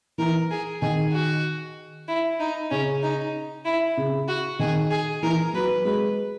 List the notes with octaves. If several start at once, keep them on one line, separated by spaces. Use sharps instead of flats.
E3 A#4
G#4
D#3 G#4
F#4
E4
D#4
C#3 C#4
D#4
E4
C#3
F#4
D#3 G#4
G#4
E3 A#4
F#3 B4
G#3 B4